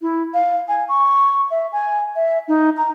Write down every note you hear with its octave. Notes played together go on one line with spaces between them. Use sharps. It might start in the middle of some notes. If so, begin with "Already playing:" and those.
E4
F5
G#5
C#6
E5
G#5
E5
D#4
A#5